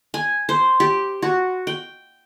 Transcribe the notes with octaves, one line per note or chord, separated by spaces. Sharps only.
G#5
C5
G4
F#4
G5